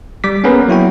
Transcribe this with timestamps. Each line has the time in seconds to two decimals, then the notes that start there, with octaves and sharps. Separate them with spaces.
0.24 G3 D6 B6
0.44 A#3 B3 C#4 G#4 A#4 B4
0.68 F#3 E4 F#4 G5